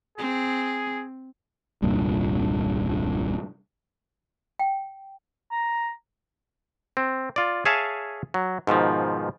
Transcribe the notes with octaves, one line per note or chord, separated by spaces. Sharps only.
C4 G#4
D#1 C2 G2 A#2
G5
A#5
C4
F4 D5
G#4 C#5 E5 F5 G#5 A5
F#3
G#2 B2 D#3 F3